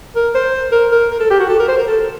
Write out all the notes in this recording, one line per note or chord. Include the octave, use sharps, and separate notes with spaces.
A#4
C5
A#4
A#4
A#4
A4
G4
F#4
A4
A#4
C5
A#4
A4